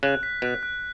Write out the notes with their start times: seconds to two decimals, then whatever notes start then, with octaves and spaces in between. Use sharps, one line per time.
0.03 C#3 F#6
0.23 B6
0.42 B2 F#6
0.63 F#6